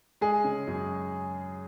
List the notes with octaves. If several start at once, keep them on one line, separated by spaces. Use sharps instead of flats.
G#3 G#4
C#3
F#2